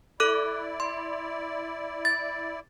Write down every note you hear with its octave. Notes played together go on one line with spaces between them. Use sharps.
E4 A4 D5 D6 F#6
C6
A6